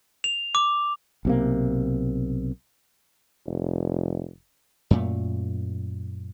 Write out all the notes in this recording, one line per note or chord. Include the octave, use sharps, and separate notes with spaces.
F7
D6
B1 C3 A#3
F1
F#2 A#2 A3